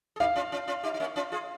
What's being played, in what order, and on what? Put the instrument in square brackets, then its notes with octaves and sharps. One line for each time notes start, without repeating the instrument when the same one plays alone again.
[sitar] G#4
[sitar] D#4 G4 [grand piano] F5
[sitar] C#4 F4
C#4 F4
C#4 F4
D#4 G4
D#4
A#3 C#4
C#4 F4
F4 G#4